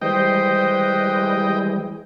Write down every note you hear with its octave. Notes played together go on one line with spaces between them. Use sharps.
E3 G3 G#3 B4 C5 D#5 G5